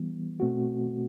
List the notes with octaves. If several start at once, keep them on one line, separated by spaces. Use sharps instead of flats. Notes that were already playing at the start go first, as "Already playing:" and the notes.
Already playing: E3 G3 B3
B2 A3 C4 F#4